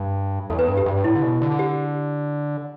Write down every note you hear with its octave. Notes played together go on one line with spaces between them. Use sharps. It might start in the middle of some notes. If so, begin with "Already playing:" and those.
Already playing: G2
E2 A4
B4
G2 A4
G4
G2
A2 E4
D3
B2
D3
G4